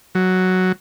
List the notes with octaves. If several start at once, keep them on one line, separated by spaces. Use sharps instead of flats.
F#3